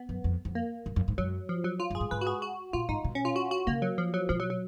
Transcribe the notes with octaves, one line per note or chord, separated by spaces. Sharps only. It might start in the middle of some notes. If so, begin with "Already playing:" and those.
Already playing: B3
F#2
F2
F2
A#3
F#2
F#2
G#2
F#2 F#3
F3
F#3
F4
F#2
G#4
G#2
G#2 B4
F#4
G#4
F#4
A#2 F4
G#2 D#4
B2
C#4
F4
F#4
F#4
C#3 A#3
F#3
F3
F#3
B2 F3
F#3
F#3